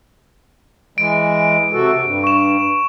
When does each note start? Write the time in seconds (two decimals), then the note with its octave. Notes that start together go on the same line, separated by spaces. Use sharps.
0.98 E3 G#3 D7
1.73 C3 F#4 A4
2.03 G2
2.24 C#6 E7